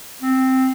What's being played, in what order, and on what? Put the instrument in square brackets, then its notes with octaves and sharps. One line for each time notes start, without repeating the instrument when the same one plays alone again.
[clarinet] C4